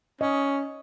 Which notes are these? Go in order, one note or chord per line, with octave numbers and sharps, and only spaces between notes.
C#4 D#5